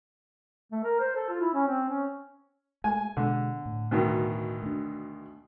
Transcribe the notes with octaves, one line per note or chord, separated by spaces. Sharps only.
A3
A#4
C5
A4
F4
E4
C#4
C4
C#4
G#3 A3 G#5
B2 D3 G#3
A2
D2 B2 D#3
A3 D4